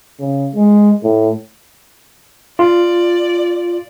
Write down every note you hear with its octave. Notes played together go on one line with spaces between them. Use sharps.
C#3
G#3
A2
F4 D5